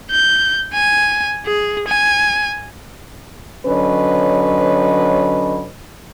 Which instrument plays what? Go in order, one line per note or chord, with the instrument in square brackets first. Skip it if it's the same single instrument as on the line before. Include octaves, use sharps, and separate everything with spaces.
[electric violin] G6
G#5
G#4
G#5
[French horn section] D3 F#3 C#4 B4 D#5